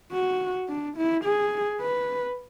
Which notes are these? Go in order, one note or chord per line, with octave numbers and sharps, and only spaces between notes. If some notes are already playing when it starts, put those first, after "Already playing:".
F#4
D4
E4
G#4
B4